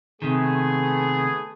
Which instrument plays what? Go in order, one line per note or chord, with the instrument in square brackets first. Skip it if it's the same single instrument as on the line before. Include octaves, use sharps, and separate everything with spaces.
[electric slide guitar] C3 D#3 [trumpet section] A3 B3 G#4